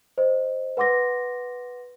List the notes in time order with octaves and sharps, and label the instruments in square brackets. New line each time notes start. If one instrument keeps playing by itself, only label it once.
[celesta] C5 D#5
B4 F#5 C6 D6 A#6